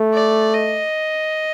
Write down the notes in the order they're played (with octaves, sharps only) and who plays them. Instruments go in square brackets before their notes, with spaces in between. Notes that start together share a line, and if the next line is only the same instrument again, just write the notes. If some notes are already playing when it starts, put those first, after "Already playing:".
Already playing: [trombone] A3
[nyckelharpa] D5
D#5